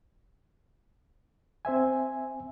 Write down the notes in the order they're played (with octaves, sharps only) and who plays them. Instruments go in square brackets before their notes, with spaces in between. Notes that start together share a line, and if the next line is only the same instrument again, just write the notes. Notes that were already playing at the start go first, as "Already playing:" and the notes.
[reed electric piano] C4 C5 E5 G#5